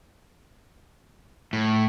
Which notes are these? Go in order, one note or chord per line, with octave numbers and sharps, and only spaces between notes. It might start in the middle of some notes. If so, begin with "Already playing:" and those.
A2